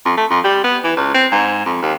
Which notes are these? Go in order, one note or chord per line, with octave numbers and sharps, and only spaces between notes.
F2
A3
F2
G3
B3
E3
C#2
C4
G#2
F2
D#2